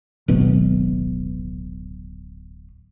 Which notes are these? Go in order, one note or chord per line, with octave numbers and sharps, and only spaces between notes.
D1 G#1 B2